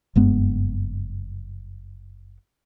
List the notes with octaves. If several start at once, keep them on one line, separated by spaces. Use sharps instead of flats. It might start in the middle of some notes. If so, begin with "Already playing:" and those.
F#1 G2 G#3 B3